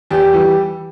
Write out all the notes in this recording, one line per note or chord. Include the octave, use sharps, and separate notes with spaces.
E2 G4
E3 G3